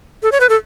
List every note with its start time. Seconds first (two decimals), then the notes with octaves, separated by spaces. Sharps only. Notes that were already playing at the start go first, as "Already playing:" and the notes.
0.23 A4
0.32 C#5
0.40 B4
0.49 A4